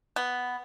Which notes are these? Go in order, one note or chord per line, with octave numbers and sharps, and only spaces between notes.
B3